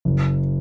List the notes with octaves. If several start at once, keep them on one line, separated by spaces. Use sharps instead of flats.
F#1